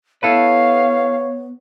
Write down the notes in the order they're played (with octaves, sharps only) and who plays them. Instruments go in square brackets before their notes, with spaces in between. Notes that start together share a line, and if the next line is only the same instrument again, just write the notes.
[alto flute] B3 [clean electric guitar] E4 A4 B4 [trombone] C#5 [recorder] F5